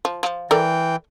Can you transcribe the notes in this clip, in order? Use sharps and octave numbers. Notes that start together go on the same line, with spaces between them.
F3
F3
E3 A4 A#4 D5 G5